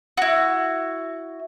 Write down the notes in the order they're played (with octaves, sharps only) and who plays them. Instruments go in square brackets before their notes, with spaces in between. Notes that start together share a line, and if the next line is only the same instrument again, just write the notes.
[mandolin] E4 F#4